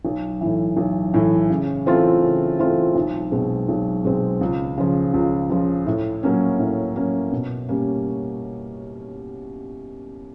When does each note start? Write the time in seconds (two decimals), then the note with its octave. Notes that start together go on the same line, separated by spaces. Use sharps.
0.05 B1
0.41 A2 E3
0.77 B1
1.14 A2 E3
1.50 C#3
1.86 E3 A3 C4 F4
2.22 C#3
2.59 E3 A3 C4 F4
2.95 B1
3.32 B2 G#3 C4
3.68 B1
4.04 B2 G#3 C4
4.41 C#2
4.78 C#3 F3
5.14 C#2
5.50 C#3 F3
5.87 A2
6.23 F#3 A#3 C#4
6.59 A2
6.96 F#3 A#3 C#4
7.32 B2
7.69 G3 A#3 C#4